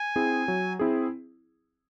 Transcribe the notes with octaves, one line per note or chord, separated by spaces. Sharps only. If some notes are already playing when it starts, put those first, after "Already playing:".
Already playing: G#5
C4 E4 G#4
F#3
C4 E4 G#4